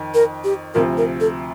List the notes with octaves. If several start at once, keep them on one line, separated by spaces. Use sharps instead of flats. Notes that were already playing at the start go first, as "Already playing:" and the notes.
Already playing: F2 D#3
A#4
G4
D2 C3 F3 A#4
A#4
A4